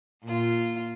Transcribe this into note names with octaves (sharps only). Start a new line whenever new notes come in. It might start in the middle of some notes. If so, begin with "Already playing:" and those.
A#2 F4